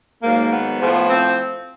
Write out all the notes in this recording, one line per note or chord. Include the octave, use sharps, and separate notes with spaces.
G#2 D#3 F#3 A#3
B3
A2 F3
C4